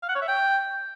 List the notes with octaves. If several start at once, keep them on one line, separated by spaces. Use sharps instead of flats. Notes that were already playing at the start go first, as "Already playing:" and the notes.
F5
F#5
C#5
E5
G5